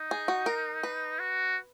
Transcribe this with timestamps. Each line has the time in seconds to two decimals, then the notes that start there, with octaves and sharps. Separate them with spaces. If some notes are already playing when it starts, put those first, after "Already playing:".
Already playing: D#4
0.11 G#4
0.28 F#4
0.46 A#4
0.83 B4
1.20 F#4